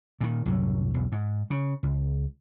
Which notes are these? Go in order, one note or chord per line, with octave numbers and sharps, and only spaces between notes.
A#2 D#3
C2 F#2 A2 F#3
B1 E2
G#2
C#3
C#2